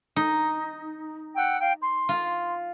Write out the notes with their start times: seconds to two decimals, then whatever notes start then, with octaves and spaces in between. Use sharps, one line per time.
0.16 D#4
1.36 F#5 G5 E6
1.59 F5 G5
1.80 C6
2.09 F4